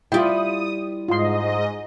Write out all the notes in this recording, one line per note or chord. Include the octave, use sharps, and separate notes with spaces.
G3 E4 F4 G4 G5 D#6
G#2 F4 D#5 C6